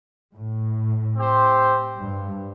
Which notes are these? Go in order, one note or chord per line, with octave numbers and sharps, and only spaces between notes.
A2
C4 G4 C5
G2